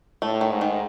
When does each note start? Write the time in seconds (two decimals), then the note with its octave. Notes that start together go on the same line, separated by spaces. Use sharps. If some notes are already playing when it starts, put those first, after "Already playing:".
0.22 A2 A3
0.41 D#3
0.52 G#2
0.61 D#3